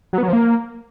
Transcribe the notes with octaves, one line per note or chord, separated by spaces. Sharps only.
F#3
B3
F#3
F3
A#3